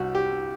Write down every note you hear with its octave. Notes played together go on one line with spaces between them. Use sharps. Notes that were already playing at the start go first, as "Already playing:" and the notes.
Already playing: C2 G3 F#4
G4